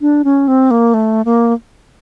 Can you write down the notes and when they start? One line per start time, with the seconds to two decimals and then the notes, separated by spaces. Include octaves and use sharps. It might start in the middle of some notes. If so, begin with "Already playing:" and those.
0.01 D4
0.24 C#4
0.48 C4
0.71 A#3
0.94 A3
1.25 A#3